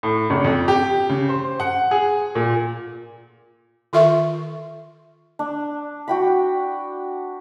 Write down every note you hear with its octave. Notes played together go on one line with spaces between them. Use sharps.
A2
F#1
F2
G4
C#3
C5
F#5
G#4
A#2
D#3 F4 A4 E5 C6 C#6
D4
F#4 G5 B5